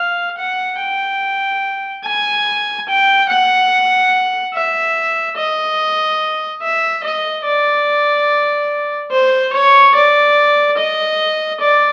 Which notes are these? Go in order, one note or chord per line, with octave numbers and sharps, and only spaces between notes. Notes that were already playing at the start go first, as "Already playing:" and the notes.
Already playing: F5
F#5
G5
G#5
G5
F#5
E5
D#5
E5
D#5
D5
C5
C#5
D5
D#5
D5